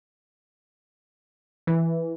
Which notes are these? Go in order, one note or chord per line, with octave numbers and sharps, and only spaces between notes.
E3